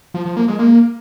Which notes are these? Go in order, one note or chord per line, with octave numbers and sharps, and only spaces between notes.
F3
F3
A#3
G#3
A#3